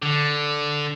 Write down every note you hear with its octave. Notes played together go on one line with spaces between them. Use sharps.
D3